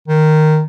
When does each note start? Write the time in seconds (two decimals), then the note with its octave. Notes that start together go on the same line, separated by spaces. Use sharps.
0.08 D#3